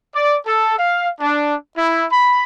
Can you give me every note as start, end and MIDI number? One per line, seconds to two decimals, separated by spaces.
0.14 0.36 74
0.46 0.75 69
0.78 1.09 77
1.20 1.55 62
1.76 2.04 64
2.10 2.43 83